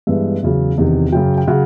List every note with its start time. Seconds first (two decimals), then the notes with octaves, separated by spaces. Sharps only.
0.07 G2 E3 G#3 B3 E5
0.43 E2 C#3 F#3
0.78 E2 C3 D#3
1.12 F#2 C#3 F#3 G5
1.37 G5
1.48 C#3 F#3 F#5